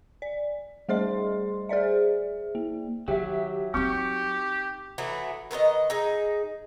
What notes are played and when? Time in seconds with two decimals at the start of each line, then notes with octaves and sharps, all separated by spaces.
0.22 D5
0.89 G3 A3 G#4 C5 D#5 C6
1.69 G#4 C5 D5 E5
2.55 A#3
3.08 D#3 F#3 G4 E5
3.74 C4 D#4 G4 C#6
4.98 E3 F#3 A3 B3
5.51 D#3 B3 B4 D#5
5.90 D#4 G#4